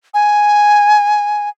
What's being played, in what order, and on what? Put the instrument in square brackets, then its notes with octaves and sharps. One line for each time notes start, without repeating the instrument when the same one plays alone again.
[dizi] G#5